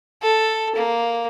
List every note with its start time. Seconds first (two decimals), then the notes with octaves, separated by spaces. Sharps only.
0.22 A4
0.75 A#3